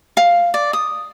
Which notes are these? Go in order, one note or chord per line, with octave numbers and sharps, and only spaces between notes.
F5
D5
D#6